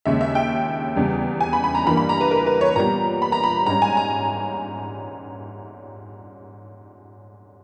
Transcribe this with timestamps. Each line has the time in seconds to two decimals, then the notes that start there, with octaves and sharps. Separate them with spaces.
0.06 D#2 C#3 G#3 C#4 E5
0.21 E5
0.35 G5
0.96 E2 C#3 G3
1.41 G#5
1.53 B5
1.64 B5
1.75 A#5
1.86 G2 E3 G3 A#3 B5
1.97 B5
2.09 A#5
2.21 B4
2.31 A#4
2.46 B4
2.61 C#5
2.76 A#2 G3 B3 A#5
3.22 B5
3.32 A#5
3.44 B5
3.66 G#2 G3 C#4 A#5
3.82 G#5
3.97 A#5